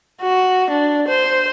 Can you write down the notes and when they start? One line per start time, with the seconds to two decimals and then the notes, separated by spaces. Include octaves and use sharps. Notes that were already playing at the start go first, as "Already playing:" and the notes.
0.21 F#4
0.70 D4
1.08 C5